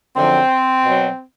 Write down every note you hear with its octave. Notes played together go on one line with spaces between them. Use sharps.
F#2 D3 F3 C4
B2 F#3